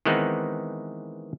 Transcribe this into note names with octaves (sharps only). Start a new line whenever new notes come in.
D#3 E3 G#3 B3 C4 D#4